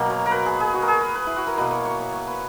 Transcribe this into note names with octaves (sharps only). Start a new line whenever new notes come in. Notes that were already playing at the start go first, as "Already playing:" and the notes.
Already playing: B2 F#3 A#3
C#5
A#4
B4
G#4
G#4
F#4
A#4
G#4
B4
B4
E4
F#4
A#4
B2 A#3 B4
C#5
C#5
C#5
C#5
B4